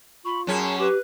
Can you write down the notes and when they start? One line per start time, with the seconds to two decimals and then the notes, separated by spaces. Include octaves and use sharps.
0.25 F4 B5 C#6
0.47 F#2 C#4 G#4 A5
0.79 G4 B4 D6